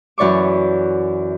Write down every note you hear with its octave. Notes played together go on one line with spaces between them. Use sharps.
F#2 E3 D5 C#6 D6